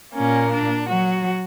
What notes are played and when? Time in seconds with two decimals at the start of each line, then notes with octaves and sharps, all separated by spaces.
0.14 A#2 A#3 C#4
0.51 D4
0.88 F#3 F#4